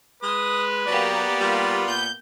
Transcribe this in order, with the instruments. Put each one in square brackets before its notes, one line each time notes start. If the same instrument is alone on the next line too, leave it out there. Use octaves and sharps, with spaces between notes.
[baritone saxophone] G#3 [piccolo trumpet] B4 [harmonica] D#6
[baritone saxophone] F#3 [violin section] A#3 G4 [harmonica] B3 D5
[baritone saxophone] G3 [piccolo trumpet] F4
[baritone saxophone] A#2 [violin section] G6